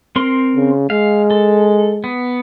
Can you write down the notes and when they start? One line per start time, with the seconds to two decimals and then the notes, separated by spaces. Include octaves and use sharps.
0.16 C4 A#4 C6
0.56 C#3
0.90 G#3 F5
1.31 A4
2.04 B3